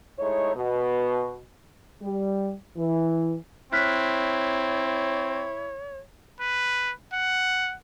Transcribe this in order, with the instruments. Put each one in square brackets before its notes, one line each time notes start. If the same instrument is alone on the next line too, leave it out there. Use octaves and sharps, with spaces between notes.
[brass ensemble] G#3 A3 D#4 E4 C#5
B2
[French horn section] G3
E3
[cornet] C4 [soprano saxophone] E4 [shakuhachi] C#5 [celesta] F6 F#6 B6
[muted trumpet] B4
F#5